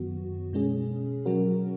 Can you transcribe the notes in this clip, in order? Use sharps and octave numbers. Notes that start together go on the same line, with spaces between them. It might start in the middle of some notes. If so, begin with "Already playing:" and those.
Already playing: F#2 D#3 F#3 B3 F#4
B2 G#3 C#4 G#4
B2 F#3 C#4 F#4 A#4